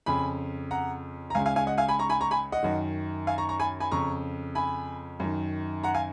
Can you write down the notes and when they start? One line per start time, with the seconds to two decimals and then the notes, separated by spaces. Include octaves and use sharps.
0.06 F2 C#3 G#5 B5
0.71 F#5 A#5
1.30 A#5
1.35 C#2 C#3 F5 G#5
1.46 F5 G#5
1.56 F5 G#5
1.67 D#5 F#5
1.78 F5 G#5
1.88 G#5 B5
1.99 A#5 C#6
2.10 G#5 B5
2.21 A#5 C#6
2.31 G#5 B5
2.52 D#5 F#5
2.63 F#2 D#3
3.27 F5 G#5
3.38 A#5 C#6
3.49 A#5 C#6
3.60 G#5 B5
3.80 G#5 B5
3.91 F2 C#3 A#5 C#6
4.55 G#5 B5
5.20 F#2 D#3
5.83 F#5 A#5
5.94 F5 G#5